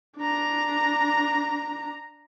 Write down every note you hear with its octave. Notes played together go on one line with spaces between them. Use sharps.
D4 A#5